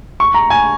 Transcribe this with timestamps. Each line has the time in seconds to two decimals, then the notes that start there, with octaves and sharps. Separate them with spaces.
0.20 C#6
0.34 A#5
0.50 G#5